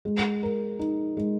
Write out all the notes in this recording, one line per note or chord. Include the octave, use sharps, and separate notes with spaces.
G#3
A#4
D#4
G#3